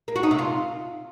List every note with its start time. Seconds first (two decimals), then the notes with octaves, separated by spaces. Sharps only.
0.08 A#3
0.16 F#4
0.23 D#4
0.31 C3
0.38 F4